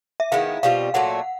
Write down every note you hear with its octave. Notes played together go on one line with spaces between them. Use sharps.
E5
D#3 G#3 B3 E4 F5
B2 G3 C4 F4 F5
A#2 F#3 A3 F#5